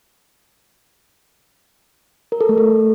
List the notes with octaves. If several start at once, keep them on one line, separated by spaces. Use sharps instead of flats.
A#4
A4
A3
A4